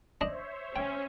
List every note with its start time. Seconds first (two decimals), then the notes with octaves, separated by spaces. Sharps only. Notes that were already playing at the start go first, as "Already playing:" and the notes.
0.21 D4 C5 C#5 D#5 E5
0.76 C#4 G5